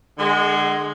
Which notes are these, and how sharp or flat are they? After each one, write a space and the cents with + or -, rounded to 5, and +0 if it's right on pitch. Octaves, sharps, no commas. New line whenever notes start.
D3 +35 G#3 +0